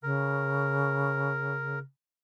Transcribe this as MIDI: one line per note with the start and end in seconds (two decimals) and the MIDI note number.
0.03 1.82 49
0.03 1.79 70